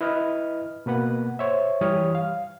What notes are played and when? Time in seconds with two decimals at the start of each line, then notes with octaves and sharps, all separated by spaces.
0.01 E4 B4 D#5 F6
0.86 B2 A#3 B4 F#5
1.39 C5 C#5 E5
1.81 E3 G3 C#5 D#6 F6
2.15 F5